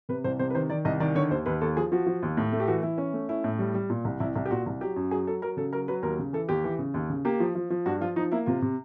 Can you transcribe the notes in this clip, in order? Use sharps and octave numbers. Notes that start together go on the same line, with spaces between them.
C3 B4
C2 C5
C3 C5
B4
D#3 C5
D#3 D5
C2 D#5
D#3 D5
D3 C#5
D#2 C5
D#2 B4
D#2 A4
F3 G#4
F3 F#4
F3
D#2
A2
A3
G4
E3 F#4
E3 E4
C#4
A3
C#4 E4
A2
G3
G3
A#2
C2
C2 E4
C2 E4
G4
A#2 F#4
C2
F#3 G4
F#2
F#3 G#4
F#3 A4
F#3 A#4
C#3 A4
F#3 A#4
F#3 B4
D#2 A#4
C#3
E3 A4
D#2 G4
E3
C#3
D#2
C#3
A#3 G4
F3
F3
F3
G2 F#4
F3 F4
F3 D#4
A#3 E4
C3 F4
C3